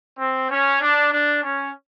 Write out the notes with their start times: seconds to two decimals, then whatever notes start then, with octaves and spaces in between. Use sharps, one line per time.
0.19 C4
0.50 C#4
0.81 D4
1.13 D4
1.44 C#4